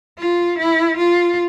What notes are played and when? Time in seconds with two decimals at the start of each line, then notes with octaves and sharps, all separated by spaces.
0.19 F4
0.58 E4
0.97 F4